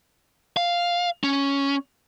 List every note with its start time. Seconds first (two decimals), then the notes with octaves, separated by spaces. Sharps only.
0.57 F5
1.24 C#4